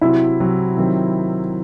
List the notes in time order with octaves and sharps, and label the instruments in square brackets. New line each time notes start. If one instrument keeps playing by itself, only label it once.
[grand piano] C3 F#3 C4 F#4 [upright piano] E4
[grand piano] C3 F#3 C4 F#4
C3 D#3 F#3 C4